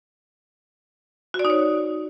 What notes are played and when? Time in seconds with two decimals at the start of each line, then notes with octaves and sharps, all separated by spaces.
1.34 F#4
1.39 D5
1.45 D#4
1.50 C#5